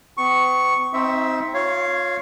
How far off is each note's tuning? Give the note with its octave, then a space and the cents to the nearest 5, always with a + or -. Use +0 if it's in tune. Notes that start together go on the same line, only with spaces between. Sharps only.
B3 +45 C#6 +0
C4 +0 D#4 +30 E5 +0
F4 +30 C#5 +0 F5 -10